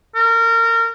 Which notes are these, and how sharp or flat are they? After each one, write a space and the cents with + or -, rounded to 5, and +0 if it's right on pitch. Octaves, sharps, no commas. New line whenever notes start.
A#4 -25